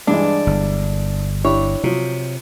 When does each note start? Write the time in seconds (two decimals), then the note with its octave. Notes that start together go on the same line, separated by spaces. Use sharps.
0.07 G2 E3 G#3 D4
0.47 G1
1.44 D4 E4 G4 C#5
1.84 C3 F3 F#3